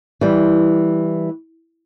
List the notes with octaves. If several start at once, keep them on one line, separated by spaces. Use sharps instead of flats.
E3 G3